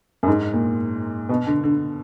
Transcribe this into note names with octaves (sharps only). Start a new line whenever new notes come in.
F#2
G#2
A#2
B2
D3
D3